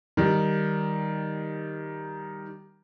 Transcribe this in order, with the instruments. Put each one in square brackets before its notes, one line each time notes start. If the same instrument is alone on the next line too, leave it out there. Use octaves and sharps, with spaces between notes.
[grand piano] D#3 G3